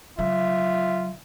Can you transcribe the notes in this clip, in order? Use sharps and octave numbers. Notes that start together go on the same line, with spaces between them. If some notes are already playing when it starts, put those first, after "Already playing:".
C#3 F#3 F4 E5